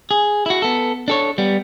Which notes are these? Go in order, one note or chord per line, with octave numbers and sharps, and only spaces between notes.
G#4
E4 F#4
B3 A4
D4 A4 C#5
G3 B3